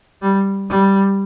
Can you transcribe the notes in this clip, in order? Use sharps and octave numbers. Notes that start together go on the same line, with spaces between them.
G3
G3